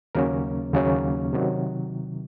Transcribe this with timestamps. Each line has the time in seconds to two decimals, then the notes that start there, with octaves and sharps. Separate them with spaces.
0.15 D#2 C#3 F#3 A#3 C#4 A#4
0.74 D#2 C#3 F#3 A#3 C#4
1.33 C3 D#3 F#3